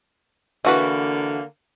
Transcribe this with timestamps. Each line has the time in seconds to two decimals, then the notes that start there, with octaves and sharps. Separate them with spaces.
0.65 D3 E3 A#3 F#4 B4